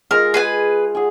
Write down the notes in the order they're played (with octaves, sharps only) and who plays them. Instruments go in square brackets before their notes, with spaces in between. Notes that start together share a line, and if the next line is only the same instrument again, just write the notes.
[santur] G#3 F4 [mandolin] A#4
[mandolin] G#4 B4 G#5
[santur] G#4 F#5 G#5